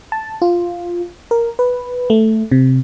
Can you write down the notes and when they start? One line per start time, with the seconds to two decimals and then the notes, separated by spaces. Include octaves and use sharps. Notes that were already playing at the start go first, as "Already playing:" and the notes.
0.12 A5
0.42 F4
1.31 A#4
1.59 B4
2.10 A3
2.51 C3